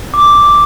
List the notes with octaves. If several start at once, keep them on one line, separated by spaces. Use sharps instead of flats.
D6